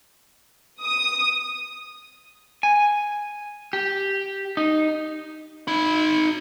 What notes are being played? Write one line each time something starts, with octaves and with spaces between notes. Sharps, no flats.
D#6
G#5
G4
D#4
D#4 B5